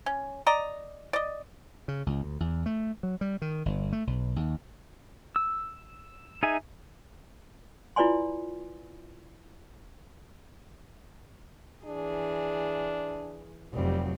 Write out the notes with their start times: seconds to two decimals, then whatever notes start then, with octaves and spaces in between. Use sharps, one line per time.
0.06 C#4
0.47 D5 D#5 A#5
1.13 D5 D#5
1.88 C#3
2.06 C#2
2.23 D2
2.40 E2
2.66 A3
3.03 F#3
3.21 G3
3.42 D#3
3.66 G1
3.92 A3
4.07 B1
4.36 D#2
5.36 E6
6.43 D#4 G#4 E5 G#5
7.96 E4 F4 B4 D5 G#5 C6
11.85 E3 D4 G#4
13.73 F1 F#3 G3 C4